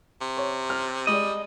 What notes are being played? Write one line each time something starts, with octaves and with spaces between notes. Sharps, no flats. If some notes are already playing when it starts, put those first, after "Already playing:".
C3
C#5
F6
G3 G#3 D5 D#5